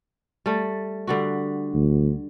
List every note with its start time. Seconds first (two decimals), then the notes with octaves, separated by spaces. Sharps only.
0.46 G3 A3
1.07 D3 G3 F#4
1.74 D2